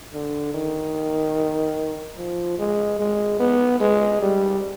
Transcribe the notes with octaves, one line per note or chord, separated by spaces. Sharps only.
D3
D#3
F3
G#3
G#3
B3
G#3
G3